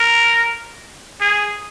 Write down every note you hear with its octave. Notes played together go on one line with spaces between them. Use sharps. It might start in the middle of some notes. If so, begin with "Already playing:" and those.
Already playing: A#4
G#4